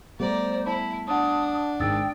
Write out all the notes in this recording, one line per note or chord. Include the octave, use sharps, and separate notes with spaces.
G3 A3 B3 C5 D5 A#5
E4 A5
D4 F#5 A5 D#6
G#1 G#2 D#3 G5 D#6 E6 A6